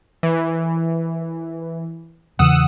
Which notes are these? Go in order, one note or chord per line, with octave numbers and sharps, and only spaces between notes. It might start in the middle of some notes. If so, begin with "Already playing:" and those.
E3
E2 C#3 E3 F#5 D#6 E6